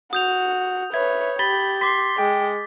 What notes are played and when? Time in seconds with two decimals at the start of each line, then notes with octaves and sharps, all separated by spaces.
0.13 F#4 D#6 G6 F7
0.94 B4 C#5 E5 G#6
1.39 G4 B5 A6 G7
1.81 C6 D6 B6
2.18 G#3 G5